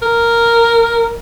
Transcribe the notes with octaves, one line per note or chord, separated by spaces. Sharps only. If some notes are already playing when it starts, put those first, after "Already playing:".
A#4